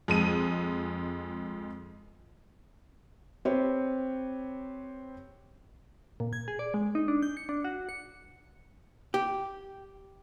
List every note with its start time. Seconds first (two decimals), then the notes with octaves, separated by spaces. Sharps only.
0.08 F2 G#3 D#7
3.45 C4 G4 B4 C#5
6.20 A#2
6.33 G#6
6.48 G#4
6.59 D5
6.74 G#3
6.95 D#4
7.08 D4
7.22 G6
7.37 C#7
7.49 D4
7.64 F#4
7.89 C#7
9.14 G4